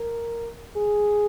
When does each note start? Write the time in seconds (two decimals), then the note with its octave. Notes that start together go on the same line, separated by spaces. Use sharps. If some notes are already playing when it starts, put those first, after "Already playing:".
Already playing: A#4
0.77 G#4